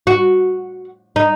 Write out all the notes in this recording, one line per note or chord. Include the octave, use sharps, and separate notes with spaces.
F#4
D#4